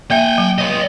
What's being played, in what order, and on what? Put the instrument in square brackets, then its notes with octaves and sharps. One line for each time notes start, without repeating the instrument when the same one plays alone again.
[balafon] A#3 E5 [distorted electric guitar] G5 G#5
[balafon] F#3
[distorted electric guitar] C#5 D#5